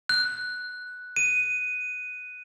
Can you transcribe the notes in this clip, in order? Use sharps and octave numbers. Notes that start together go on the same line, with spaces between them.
F#6
D#7